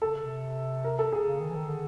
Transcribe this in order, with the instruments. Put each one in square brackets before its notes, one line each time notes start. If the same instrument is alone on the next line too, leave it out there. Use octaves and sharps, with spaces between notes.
[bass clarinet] C#3 [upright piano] A4
[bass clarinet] C3
[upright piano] A#4
A4
G#4
[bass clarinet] C#3
D#3
E3
D#3
D3